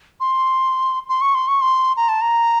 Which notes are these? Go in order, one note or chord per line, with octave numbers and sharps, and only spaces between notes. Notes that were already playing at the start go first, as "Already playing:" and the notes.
C6
C6
C#6
C6
C#6
C6
A#5
A5
A#5